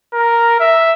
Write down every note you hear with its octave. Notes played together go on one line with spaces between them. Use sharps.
A#4
E5